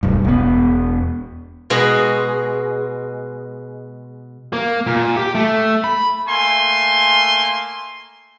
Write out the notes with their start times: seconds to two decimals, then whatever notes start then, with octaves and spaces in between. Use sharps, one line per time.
0.03 D1 B1 G2
0.24 E1 B3
1.70 B2 G#3 F#4
4.53 A#3
4.87 A#2
5.17 G4
5.35 A3
5.84 B5
6.28 A3 A#3 G#5 C6